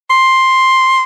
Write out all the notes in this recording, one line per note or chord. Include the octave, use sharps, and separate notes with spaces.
C6